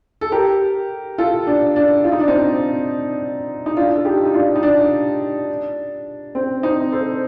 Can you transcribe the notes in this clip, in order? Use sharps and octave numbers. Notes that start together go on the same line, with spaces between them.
A4
G4 A#4
F4 A4
D4
D4
F4
D#4
D4
C4 D#4
D#4
D4 F4
A4
D#4 G4
D#4
D4 F4
D#4
D4
C4
C4 D#4
A4 C5